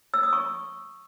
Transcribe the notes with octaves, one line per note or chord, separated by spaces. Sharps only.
E6
D#6
C#6